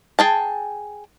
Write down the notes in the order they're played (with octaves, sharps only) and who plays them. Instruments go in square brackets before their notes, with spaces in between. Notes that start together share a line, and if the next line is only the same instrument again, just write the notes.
[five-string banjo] G#4 G5 A5